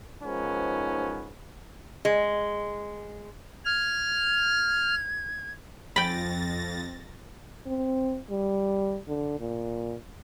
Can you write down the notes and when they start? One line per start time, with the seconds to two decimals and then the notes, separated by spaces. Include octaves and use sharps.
0.23 G#2 D#3 F3 B3 C#4
2.05 G#3
3.65 F6 G#6
5.96 F2 G5 B5 A6 A#6
7.66 C4
8.31 G3
9.08 D3
9.40 A#2